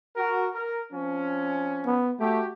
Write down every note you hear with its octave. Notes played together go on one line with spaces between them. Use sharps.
F#4 A#4
A#4
F3 C4 C#4
B3
A3 F#4 G4